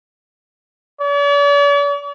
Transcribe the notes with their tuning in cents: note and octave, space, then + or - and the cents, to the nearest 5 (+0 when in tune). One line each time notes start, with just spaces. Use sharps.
D5 -45